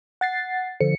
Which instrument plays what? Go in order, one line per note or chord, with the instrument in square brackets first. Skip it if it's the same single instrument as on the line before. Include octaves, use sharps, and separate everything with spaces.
[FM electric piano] F#5 A6 C7
[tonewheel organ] D3 F3 [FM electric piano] C#7